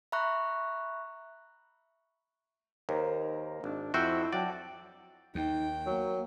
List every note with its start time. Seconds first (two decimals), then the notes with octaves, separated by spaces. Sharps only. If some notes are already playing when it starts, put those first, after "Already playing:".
0.12 E5 A#5 B5 C#6 F#6
2.89 D#2 A#4 C5 A#5
3.64 G#1 D4
3.94 F2 E4 F#4 C5 G5 E6 G6
4.33 F#3 D5 F#5 G5 A5
5.35 D#2 D#4 G5
5.86 F#3 A#3